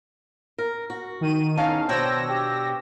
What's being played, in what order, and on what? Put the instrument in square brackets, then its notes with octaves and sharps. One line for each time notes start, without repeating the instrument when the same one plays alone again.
[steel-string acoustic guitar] A#4
F#4
[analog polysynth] D#3 D#7
[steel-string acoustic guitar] E2 D#4 [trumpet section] C#4 A5 A#5 [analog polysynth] F5
[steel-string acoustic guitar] B2 D4 C#5 [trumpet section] C5 G5 [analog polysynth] E6 A#6
[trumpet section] G4 G5